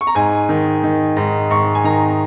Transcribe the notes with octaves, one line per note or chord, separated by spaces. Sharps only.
C#6
A#5
G#2 G#5
D#3
D#3
G#2
G#2 C#6
G#5
D#3 A#5